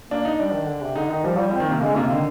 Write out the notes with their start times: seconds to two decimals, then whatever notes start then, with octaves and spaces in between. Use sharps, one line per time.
0.10 A#3 D4
0.25 D#4
0.39 G3 D4
0.53 D#3
0.68 D3
0.82 C3
0.96 D3 D#4
1.10 D#3 D#4
1.24 F3 G3
1.39 F3 G3
1.50 F3 C4
1.60 D#3
1.67 C3 A#3
1.81 D3 G#3
1.96 C3 A#3
2.10 D3 D#3